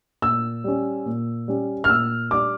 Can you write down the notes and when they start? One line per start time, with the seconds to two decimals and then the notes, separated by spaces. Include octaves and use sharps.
0.22 A#2 E6
0.64 G3 C#4
1.06 A#2
1.48 G3 C#4
1.84 F6
1.89 A#2 E6
2.31 G3 D4 D6